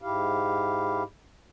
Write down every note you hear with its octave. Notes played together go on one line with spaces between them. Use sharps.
G#2 E4 G4 F5